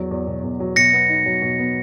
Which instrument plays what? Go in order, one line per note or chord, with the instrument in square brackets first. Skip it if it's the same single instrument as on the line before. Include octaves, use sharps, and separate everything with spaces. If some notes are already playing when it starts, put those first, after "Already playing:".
Already playing: [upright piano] E2 F#3
E2
B2
E2
F#3
[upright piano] B2 [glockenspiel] A#6 C#7
[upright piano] B3
D#4
F#3
B2
B3